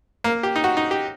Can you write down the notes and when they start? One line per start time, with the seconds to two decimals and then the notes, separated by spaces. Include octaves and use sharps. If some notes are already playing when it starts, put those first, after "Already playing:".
0.24 A#3
0.43 G4
0.56 D#4
0.64 F#4
0.77 D#4
0.91 G4